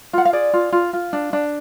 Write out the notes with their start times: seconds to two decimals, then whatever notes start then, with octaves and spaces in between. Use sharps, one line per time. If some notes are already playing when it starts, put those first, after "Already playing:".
0.13 F4 F#5
0.25 F5
0.33 G#4 D5
0.53 F4
0.72 F4
0.93 F4
1.13 D4
1.33 D4